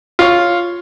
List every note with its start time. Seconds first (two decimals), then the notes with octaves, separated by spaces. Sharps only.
0.19 F4 C#5